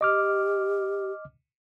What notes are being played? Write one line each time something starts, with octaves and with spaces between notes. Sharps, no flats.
G4 D#5 D6 F6